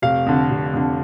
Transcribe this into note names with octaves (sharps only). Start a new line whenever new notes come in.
F1 F5
F2 D3
F1
F2 D3